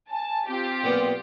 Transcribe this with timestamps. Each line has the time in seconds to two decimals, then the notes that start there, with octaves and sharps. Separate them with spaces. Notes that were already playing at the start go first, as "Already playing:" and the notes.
0.11 G#5 A5
0.48 C4 F4 G4
0.84 B1 A#2 B3